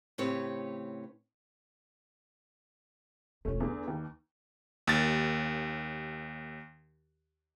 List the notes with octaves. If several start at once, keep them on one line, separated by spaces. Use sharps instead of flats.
A2 C#3 C4 G4 B4 C#5
E1 A3 C#4 F4
E2 D3 B3
D#2
D#2 A6